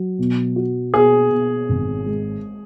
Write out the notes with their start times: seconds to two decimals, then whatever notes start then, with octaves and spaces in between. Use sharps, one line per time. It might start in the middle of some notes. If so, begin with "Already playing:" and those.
Already playing: F#3
0.19 B2
0.56 F#4
0.94 B2 G#4
1.31 B2
1.69 G#1
2.06 G#3